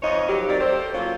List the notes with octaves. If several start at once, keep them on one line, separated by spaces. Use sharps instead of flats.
F2 F3 C#5 D#5
D#3 F3 F#3 G4
F#3 C4 A#4 D5
G4 A4 C5
F#3 A#3 C#4 F4